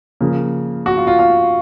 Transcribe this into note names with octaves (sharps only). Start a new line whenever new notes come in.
C#3 F3 A#3
F#4
F4
F4
F4